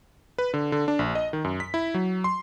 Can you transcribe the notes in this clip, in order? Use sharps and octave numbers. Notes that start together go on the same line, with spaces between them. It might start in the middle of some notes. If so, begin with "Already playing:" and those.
B4
D3
D3
D4
A#1
D#5
D#3
F#2
B6
E4
F#3
C6